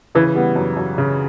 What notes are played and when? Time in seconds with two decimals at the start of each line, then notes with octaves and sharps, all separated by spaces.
0.15 C#3 E3
0.35 G3 B3
0.56 F#2
0.77 F#2
0.98 C#3